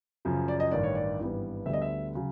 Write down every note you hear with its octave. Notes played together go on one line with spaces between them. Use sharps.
F#2 C#3 F3
D5
D#5
A1 G2 D#3 D5
C#5
D5
G#1 G2 E3 G3 B3
D2 D3 G3 B3 E5
D#5
E5
C#3 F#3